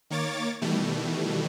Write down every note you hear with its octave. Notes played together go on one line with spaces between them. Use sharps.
D#3 A#3 C#5 D6 A6
B2 D#3 E3 G3 A3